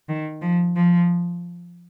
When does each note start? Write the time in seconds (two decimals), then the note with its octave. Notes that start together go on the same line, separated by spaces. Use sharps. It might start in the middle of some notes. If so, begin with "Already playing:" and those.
0.09 D#3
0.42 F3
0.76 F3